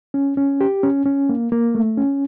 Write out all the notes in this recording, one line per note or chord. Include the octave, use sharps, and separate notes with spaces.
C#4
C#4
G4
C#4
C#4
A#3
A#3
A3
C#4